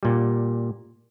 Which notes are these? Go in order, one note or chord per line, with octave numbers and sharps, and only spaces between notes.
A#2 G3